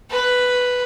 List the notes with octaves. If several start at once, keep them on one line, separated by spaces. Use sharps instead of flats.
B4